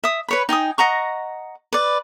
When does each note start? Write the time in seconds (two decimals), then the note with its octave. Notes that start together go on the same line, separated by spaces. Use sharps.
0.04 E5 D#6
0.29 B4 C#5 B5
0.49 D#4 G5 G#5 D#6
0.78 D#5 F#5 A#5 C#6
1.73 B4 D5